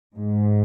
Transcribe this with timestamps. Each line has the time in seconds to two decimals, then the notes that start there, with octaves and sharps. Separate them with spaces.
0.16 G#2